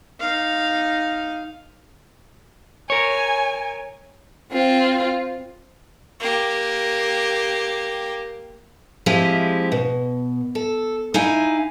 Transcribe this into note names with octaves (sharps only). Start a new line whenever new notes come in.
D#4 F5
A#4 C#5 G#5
C4 F4
A#3 G4
F3 G#3 C4 E4 G4
B2
A4
D#4 E4 F5 G#5